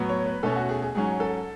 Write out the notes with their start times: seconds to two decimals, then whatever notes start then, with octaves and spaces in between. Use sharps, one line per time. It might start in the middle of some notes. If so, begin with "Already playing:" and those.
Already playing: A2 F#3 B3
0.09 C#5
0.26 B4
0.43 B2 A3 C#4 A4
0.56 F#4
0.69 G#4
0.82 G#4
0.95 G#2 F#3 C#4 G#4
1.20 A4